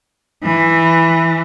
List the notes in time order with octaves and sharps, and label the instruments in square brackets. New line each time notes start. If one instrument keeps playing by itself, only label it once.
[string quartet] E3